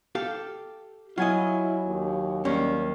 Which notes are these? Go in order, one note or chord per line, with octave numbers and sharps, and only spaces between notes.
G4 A4 F5
F#3 E4 F4 D#5 G#5
D#2
D#2 G3 C#4